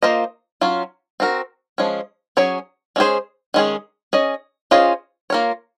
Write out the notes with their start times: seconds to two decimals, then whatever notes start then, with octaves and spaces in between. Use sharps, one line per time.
0.03 A#3 F4 C5 D#5
0.61 F#3 C#4 F4
1.20 C4 F#4 A#4
1.78 F3 G#3 C#4
2.37 F#3 C#4 G#4 C#5
2.96 G#3 C#4 F4 G#4 C5
3.54 D#3 G#3 C#4 G#4
4.13 C#4 G#4 D#5
4.71 C#4 F4 G#4 C5 D#5
5.30 A#3 F4 A#4 C#5